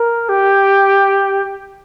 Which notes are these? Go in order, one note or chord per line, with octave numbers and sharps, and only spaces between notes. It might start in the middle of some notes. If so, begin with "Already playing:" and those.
Already playing: A#4
G4